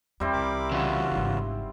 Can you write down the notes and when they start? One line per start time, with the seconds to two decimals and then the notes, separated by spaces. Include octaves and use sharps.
0.20 E2 G3 C4 E4
0.32 C2 A#4 B5 D6
0.72 C#3 E3 F4 F#4
1.11 G#1 D#4